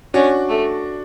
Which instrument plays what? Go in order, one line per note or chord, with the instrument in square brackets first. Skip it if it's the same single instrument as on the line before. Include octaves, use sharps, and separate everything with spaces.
[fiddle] C#4 [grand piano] D4 F#4
[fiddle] A3